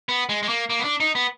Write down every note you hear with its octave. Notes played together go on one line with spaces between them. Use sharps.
B3
G#3
G#3
A#3
A#3
B3
D4
D#4
B3